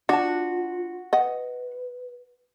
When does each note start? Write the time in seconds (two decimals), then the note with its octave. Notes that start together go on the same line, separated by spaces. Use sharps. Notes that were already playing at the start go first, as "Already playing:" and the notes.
0.09 D4 F4 F#4 A5
1.13 B4 D#5 F#5